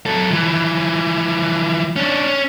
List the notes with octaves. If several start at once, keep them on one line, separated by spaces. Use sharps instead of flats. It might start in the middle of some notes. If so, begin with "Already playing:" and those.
F#3 A4
E3 F3
C#4 D4
C#4